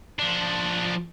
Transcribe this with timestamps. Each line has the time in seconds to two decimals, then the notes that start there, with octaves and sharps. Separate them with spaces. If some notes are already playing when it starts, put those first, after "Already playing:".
0.19 F3 D4